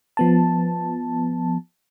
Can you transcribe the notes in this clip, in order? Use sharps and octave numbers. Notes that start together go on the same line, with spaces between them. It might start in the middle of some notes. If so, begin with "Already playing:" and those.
F3 B3 A5